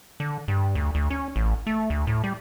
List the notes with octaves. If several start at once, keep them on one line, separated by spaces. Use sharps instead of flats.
D3
G2
D2
D2
C#4
A1
A3
D2
A2
G3